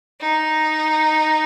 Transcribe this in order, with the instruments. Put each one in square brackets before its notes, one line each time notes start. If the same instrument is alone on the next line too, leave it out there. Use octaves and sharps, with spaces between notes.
[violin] D#4